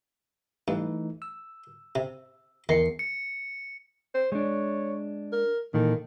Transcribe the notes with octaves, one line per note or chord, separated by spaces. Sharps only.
G2 E3 A3 D#4
E6
C3
E2 D#3 C7 C#7
C#7
C5
G#3 D4 C#5
A#4
A#2 D#3 E3 A4